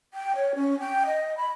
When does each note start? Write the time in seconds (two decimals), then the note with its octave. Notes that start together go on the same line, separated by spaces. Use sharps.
0.14 G5
0.35 C#5
0.55 C#4
0.79 G5
1.06 D#5
1.37 B5